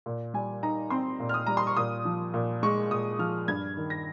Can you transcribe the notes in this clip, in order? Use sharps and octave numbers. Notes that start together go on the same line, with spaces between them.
A#2
G3 G#5
D#4 A#5
C4 C6
A#2
F6
D#6
G3 A#5
C6
C#6
A#2 D#6
F3
A#2
G#3 C#6
A#2 D#6
F3 F6
G2 G#6
D#3
A#6